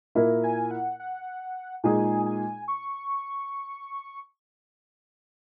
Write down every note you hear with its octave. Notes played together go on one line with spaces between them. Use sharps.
A#2 A#3 E4 A#4
G#5
F#5
F#5
A#2 G#3 D#4 G#4 G#5
G#5
C#6